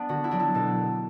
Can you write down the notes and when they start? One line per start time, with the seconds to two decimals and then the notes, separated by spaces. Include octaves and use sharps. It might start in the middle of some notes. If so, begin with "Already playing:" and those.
Already playing: B3 D4
0.09 D3 F#4
0.24 E4
0.31 F#3 D4
0.40 E4
0.54 B2 A4